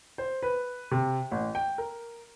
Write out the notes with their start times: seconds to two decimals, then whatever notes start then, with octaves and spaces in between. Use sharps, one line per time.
0.18 C5
0.43 B4
0.91 C3
1.31 A1
1.55 G5
1.78 A#4